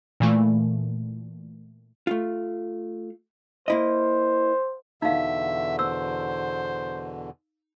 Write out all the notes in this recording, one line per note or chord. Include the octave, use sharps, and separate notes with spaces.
A#2 E3 A3
A3 F4
A#3 E4 C5 D#5
E2 B2 D3 D#4 E5 F5
C5 E6